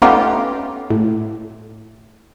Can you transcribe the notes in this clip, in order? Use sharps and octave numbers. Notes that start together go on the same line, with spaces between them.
A3 B3 C#4 D#4 F4 G4
A2